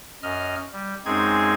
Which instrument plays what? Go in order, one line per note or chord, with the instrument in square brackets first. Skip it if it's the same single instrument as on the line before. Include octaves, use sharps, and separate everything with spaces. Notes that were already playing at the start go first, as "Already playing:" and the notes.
[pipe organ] F#2 D#5 F6
G3
F#2 G#3 C4 D#4 G#4 G#6